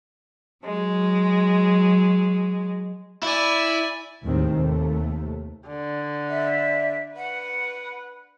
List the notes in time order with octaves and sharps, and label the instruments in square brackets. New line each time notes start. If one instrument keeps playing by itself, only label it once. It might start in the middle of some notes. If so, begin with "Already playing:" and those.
[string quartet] F#3 G#3
[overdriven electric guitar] E4 [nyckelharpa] D5 G#5
[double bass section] D#2 A2 D#3 G#3 C4
D#2 C3 A3
[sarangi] D3
[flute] E5
[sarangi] B4 [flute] F#5